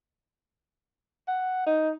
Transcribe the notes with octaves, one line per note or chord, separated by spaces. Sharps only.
F#5
D#4